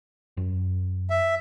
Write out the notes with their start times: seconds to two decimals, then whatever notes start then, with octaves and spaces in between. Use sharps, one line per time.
0.37 F#2
1.10 E5